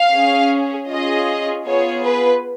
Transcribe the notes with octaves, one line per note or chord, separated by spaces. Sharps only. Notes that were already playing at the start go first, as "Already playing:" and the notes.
Already playing: F5
C#4 G#4
C#4 F4 G#4 D#5
B3 F4 G#4 C#5
B4